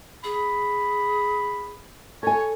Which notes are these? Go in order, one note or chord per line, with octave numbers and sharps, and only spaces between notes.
G#4 B5
A4 C#5 G#5